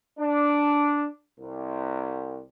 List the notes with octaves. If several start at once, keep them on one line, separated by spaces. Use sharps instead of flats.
D4
C2